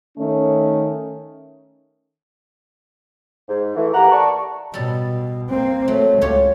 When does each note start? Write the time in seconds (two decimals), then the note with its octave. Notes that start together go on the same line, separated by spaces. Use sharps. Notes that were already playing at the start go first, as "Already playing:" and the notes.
0.18 D#3 A3 C#4
3.49 G#2
3.76 E3 A3
3.94 A#3 G4 F#5 A#5
4.12 D5 A5 C#6
4.74 B2 G3 A4
5.50 A#3 C4
5.88 F#3 A3
6.21 C#2 F4 G4 C#5